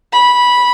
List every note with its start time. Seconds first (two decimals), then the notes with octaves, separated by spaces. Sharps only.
0.13 B5